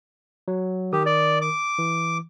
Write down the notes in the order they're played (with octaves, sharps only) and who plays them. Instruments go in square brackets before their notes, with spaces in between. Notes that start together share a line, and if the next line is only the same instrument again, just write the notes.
[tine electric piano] F#3
[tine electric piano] D#3 A#4 D#6 [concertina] G4
[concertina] D5
D6
[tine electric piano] E3